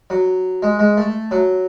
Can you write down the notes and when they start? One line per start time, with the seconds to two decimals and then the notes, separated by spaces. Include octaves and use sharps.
0.10 F#3
0.63 G#3
0.79 G#3
0.97 A3
1.31 F#3